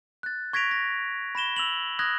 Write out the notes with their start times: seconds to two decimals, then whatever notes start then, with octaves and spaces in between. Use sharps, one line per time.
0.23 F#6 A6
0.53 C#6 G#6 A#6 B6 D7 F7
0.71 A#6
1.35 B5 A#6 E7 G7
1.56 E6 F7 F#7
1.99 D#6 F6 F#6 G#6 A#6